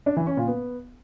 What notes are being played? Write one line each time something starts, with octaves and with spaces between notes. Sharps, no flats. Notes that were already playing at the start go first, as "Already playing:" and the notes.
D4
E3
C#4
A#2
B3